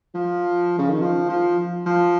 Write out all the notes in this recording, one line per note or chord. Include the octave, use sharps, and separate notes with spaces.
F3
C#3
D#3
F3
F3
F3